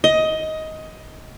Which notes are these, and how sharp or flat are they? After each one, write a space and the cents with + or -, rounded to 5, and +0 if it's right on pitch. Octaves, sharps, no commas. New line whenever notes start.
D#5 +15